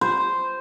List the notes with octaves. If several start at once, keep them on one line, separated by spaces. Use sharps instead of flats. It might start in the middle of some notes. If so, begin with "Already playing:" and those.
C5